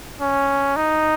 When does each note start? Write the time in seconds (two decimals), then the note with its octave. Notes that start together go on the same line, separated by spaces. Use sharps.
0.21 C#4
0.76 D#4